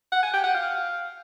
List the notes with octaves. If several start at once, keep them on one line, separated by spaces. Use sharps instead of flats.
F#5
G#5
G5
F#5
F5